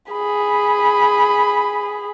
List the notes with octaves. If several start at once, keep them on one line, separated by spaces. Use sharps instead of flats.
G#4 B5